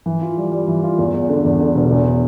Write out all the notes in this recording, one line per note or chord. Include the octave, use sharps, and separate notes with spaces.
E3
F4
G3
G3
E3
F4
E2
E2
D3
E2
D3
E1
E2